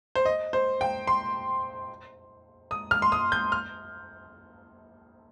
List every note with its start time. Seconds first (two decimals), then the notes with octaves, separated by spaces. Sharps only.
0.15 C5
0.25 D#5
0.53 C5
0.81 G5
1.07 C6
2.71 D#6
2.91 F6
3.02 C6
3.12 D#6
3.32 G6
3.52 F6